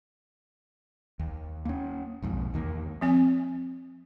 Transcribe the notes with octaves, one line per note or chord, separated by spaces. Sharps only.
D#2
A#3 C#4
B1 F2 G#2
E2 D#3 A#3
F3 C4 G#5